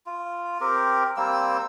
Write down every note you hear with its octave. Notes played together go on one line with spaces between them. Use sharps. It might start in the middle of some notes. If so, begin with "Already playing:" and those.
F4
C4 G4 A#4
G3 A#3 C4 E6